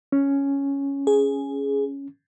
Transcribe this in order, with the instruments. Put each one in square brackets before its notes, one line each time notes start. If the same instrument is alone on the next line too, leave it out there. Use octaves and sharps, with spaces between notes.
[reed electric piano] C#4
[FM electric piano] G#4